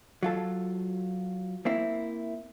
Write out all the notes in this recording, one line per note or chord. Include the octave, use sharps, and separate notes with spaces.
F#3 F4 A4
A#3 C4 E4